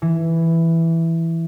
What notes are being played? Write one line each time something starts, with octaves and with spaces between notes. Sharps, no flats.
E3